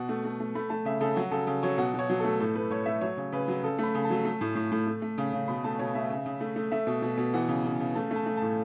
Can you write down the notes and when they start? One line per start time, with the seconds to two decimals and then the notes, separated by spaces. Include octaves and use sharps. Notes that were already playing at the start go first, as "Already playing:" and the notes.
Already playing: B2 F#5
0.09 A3
0.25 A3
0.40 A3
0.55 A3 B5
0.70 A3 A5
0.85 C#3 E5
1.01 C#3 A4
1.16 F#3 F#4
1.31 C#3 A4
1.47 C#3
1.63 F#3 C#5
1.78 B2 F#5
1.94 B2 C#5
2.09 F#3
2.20 A3 A4
2.40 A2 A4
2.55 A3 B4
2.70 A2 C#5
2.86 A3 E5
3.01 F#3 C#5
3.17 C#3
3.32 C#3 B4
3.48 F#3
3.63 C#3 A4
3.78 A3 B5
3.95 C#3
4.05 A5
4.10 F#3
4.25 A3
4.41 A2
4.55 A2
4.72 A2
4.87 A3
5.02 A3
5.18 C#3
5.33 C#3
5.48 B2 B5
5.64 A3 A5
5.79 B2 C#5
5.95 A3 E5
6.10 C#3
6.26 C#3
6.40 A3
6.56 A3
6.72 A3 E5
6.87 B2
7.02 B2
7.18 B2
7.33 E3 F#5
7.48 C#3
7.65 C#3
7.80 C#3
7.95 A3 A5
8.11 A3
8.16 A5
8.26 A3
8.37 A2 A5